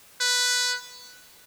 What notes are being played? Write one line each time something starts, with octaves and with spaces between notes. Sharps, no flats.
B4